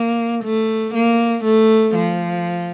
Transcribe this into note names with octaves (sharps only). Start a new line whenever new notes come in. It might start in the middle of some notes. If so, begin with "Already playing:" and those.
Already playing: A#3
A3
A#3
A3
F3